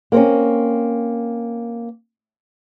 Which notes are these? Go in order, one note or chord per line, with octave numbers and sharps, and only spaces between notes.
A#3 C4 C#4